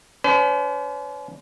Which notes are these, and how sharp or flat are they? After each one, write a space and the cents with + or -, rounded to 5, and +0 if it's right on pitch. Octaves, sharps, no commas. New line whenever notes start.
C#4 +40 C5 -45